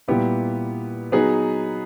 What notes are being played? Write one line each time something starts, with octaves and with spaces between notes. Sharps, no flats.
A#2 G3 B3 E4 G4
F#3 B3 D#4 G#4 B4